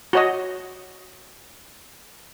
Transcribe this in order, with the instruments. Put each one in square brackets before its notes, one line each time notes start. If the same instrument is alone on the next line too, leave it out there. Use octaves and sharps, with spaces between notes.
[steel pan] F#4 C#5 D#5